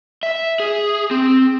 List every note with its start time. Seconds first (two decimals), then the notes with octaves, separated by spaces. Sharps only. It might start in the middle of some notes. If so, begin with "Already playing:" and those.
0.23 E5
0.60 G#4
1.11 C4